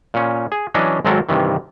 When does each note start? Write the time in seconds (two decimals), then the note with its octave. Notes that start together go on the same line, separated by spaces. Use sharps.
0.14 A#2 C#4
0.52 G#4
0.74 E3 F#3 C#4 D4 D#5
1.05 G#1 G#2 F#3 C4 A4 A#4
1.29 G2 C3 D#3 E3